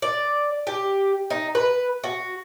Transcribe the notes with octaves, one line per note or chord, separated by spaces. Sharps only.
D5
G4
D#4
B4
F#4